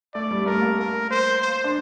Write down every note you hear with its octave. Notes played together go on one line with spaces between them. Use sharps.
A3 D5
G3
A3 A#4
A#3
A#4
C5
C5
D4